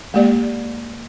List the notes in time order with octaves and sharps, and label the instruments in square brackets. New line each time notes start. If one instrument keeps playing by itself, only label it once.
[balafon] G#3 A#3 G4 D5